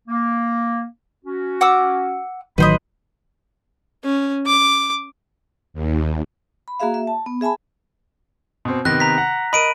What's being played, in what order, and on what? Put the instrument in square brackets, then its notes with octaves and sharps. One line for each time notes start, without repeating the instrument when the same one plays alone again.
[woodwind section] A#3
C#4 F#4
[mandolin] F#5 D6 E6
[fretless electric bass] A1 D#3 F#3 [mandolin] B4 C5 D#5 [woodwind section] B5
[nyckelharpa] C#4
D6
[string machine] D#2
[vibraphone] B5
A#3 F#4 G#4 E5 F5
E5
A5
B3
G#4 E5 G#5 A5 B5
[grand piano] B2 C4
[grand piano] C3 D#3 B3 [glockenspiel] F#6 A#6
[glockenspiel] A#5 B6
[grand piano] F#5
[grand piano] A#4 D#5 [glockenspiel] B5 D7 D#7